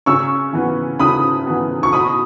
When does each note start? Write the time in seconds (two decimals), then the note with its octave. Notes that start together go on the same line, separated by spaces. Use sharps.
0.06 C#3 C#6 E6
0.53 E3 B3
0.99 C#3 B5 D#6
1.47 E3 B3
1.83 C#6
1.93 B2 B5 D#6